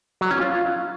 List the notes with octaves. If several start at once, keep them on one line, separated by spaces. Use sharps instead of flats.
F#3
C#4
F4